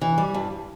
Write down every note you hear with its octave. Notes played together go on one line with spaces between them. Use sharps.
E3
G3
G2